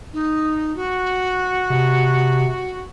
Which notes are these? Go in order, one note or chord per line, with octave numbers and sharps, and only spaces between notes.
D#4
F#4
C3